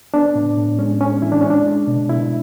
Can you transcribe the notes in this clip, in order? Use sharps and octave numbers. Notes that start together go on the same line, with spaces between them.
B3 D4
A2
A2
G#3 C#4
G#3 C#4
E3 E4
D4
G#3 C#4
D4
G#3
B2
B2 E4